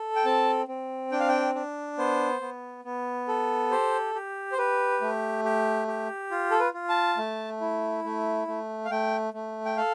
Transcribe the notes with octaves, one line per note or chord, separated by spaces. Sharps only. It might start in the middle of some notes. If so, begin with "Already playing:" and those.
Already playing: A4
G5
C4 A5
C4
D4 G5
F5
G5
D4
B3 C5
B3
B3
A4
G4 C5
G4
C5
G4 B4
A3
G4
G4
F4
A4
B4
F4
A5
A3
E4
A3
A3
F5
A3 G5
A3
G5
A4 F5